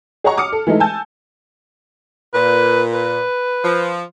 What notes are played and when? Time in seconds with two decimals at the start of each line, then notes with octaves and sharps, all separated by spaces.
0.24 G#4 C#5 D#5 F#5 A#5 C#6
0.38 D6 D#6 F6 C#7
0.52 A4
0.67 E3 G#3 A3 D#4 A4
0.80 G#5 A5 E6 G6
2.34 A#2 B4
2.93 B4
3.64 F3